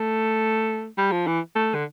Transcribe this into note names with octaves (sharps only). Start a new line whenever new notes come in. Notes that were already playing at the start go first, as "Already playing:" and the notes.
Already playing: A3
G3
F3
E3
A3
D3